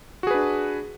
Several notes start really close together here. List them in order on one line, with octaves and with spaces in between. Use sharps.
F#4 G#4 B4 D4